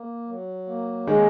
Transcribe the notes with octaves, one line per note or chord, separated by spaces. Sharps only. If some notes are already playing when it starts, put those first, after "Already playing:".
Already playing: A#3
F#3
A#3
D#3 G#3 C#4